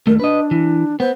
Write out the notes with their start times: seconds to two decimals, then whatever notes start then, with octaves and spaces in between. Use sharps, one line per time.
0.07 D#2 A3 A#4
0.20 D4 B4 D#5
0.51 E3
1.00 B3 C5